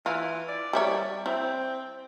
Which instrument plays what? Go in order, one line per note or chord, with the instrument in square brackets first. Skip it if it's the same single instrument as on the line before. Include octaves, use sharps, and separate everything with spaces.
[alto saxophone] E3 [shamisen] F4
[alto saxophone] D5
[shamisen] G3 E4 C#5
[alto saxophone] C4 [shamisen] E4